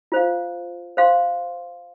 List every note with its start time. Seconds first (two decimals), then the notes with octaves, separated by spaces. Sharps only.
0.12 F4 C5 F5
0.97 C5 F5 C6